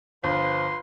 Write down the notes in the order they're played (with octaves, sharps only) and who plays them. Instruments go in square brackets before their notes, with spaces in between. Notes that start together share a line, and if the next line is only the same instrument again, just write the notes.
[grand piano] G1 [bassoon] F3 [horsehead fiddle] F4 B4 [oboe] C6